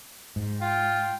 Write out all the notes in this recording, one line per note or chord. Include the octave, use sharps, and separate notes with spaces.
G#2
F4 G5